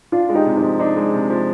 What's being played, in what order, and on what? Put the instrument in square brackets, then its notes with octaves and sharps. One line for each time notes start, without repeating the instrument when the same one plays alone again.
[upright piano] D4 [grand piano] F4
[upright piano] G#3
[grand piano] D#4 G4
[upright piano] C3
[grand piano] D#4 G4
[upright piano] F3
[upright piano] D4 [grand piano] D#4
[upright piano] G#3
C3
F3